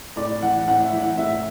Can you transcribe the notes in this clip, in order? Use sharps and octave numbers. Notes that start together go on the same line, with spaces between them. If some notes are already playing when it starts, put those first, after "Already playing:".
A2 D5
E3 F#5
A2 F#5
E5
E3
F#5
A2 E5